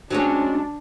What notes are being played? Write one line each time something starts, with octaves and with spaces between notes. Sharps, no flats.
F#3 G#3 C#4 D4